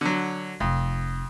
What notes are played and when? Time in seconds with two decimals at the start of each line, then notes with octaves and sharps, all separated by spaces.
0.01 D3 F#3
0.60 F1 F2